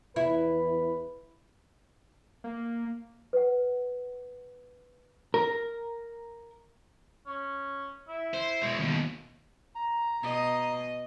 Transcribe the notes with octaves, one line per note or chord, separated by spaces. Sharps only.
E2 E4 B4
A#3
B4 F#5
A#4
C#4
E4
C5
B2 G#3
D#2 B2
A#5
B2 D#5